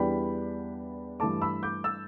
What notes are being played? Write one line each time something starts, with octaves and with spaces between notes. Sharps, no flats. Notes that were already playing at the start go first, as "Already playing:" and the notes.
Already playing: E2 E3 G3 B3 D4 G5 B5
G2 E3 A3 A5 D6
B5 E6
D6 G6
E6 A6